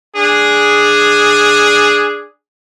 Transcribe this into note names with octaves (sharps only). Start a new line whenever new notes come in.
D4 G#4